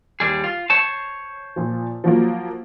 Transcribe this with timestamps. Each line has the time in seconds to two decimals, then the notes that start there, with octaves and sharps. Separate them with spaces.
0.20 D#2 G3 G#4
0.44 F4
0.70 C5 C#5 A5
1.56 A#2 F3
2.04 F3 F#3 A#3